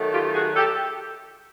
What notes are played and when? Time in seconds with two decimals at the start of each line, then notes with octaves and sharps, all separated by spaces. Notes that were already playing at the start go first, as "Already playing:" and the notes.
Already playing: D#3 F#3 A3
0.13 F4 G4
0.34 F#4 G#4
0.56 G4 A4